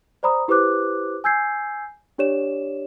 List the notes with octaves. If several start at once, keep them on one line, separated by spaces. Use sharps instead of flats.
C5 D5 A#5 B5 D#6
E4 G4 B4 C5 D6 F#6
G#5 E6 G6 G#6 C7
D4 G4 C#5 D5 E7